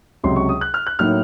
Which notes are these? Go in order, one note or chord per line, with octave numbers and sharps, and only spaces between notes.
C#2 C3 F#3 C6
C#6
D#6
F#6
F6
F#6
A2 F#3 A#3 D#4 F6